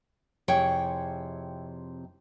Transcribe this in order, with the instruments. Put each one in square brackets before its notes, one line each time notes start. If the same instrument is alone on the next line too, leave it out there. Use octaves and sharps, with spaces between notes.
[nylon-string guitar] F2 C3 E4 G#4 C#5 G5